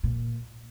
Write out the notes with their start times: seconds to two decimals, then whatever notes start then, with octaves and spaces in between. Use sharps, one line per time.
0.03 A#2